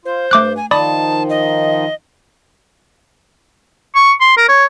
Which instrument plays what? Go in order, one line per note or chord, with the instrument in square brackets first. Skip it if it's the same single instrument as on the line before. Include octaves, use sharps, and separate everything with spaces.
[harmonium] F4 [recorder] C5
[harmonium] G2 [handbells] A3 D6 F#6
[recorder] G#5
[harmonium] D#3 F3 D#4 [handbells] D5 B5 D#6 [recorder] A5
[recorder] D#5
[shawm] C#6
C6
A#4
C#5